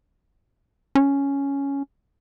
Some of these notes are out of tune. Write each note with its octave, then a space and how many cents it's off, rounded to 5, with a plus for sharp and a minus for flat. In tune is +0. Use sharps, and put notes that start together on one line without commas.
C#4 +5